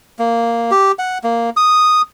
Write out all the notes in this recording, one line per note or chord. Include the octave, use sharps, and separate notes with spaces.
A#3
G4
F#5
A#3
D#6